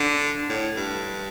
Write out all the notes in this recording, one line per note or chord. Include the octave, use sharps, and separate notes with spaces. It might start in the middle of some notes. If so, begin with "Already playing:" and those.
Already playing: D3
A2
G2